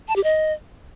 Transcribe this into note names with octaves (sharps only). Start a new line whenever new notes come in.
A5
G4
D#5